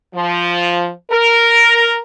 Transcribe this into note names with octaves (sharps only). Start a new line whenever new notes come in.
F3
A#4